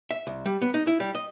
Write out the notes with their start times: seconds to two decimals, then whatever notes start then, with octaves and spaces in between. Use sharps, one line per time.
0.11 E5
0.27 C2
0.46 G3
0.62 B3
0.74 D#4
0.87 E4
1.00 G3
1.15 D#5